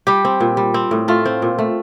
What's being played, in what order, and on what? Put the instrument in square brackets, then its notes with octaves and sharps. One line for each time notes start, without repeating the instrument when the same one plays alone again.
[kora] G3 G4
C4
A#2
G3
C4
A2
A3 F4
C4
A#2
A3